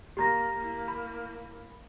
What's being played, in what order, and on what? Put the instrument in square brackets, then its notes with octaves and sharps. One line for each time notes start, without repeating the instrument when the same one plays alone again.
[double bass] A#3 [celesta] G4 A#5 A#6
[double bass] A#3 E4
[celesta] B5